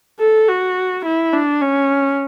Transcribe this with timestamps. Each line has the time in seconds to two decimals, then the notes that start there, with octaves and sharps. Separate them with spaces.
0.20 A4
0.48 F#4
1.05 E4
1.33 D4
1.62 C#4